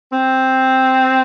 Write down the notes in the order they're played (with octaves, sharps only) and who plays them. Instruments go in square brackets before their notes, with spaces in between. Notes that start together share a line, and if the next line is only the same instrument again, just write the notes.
[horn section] C4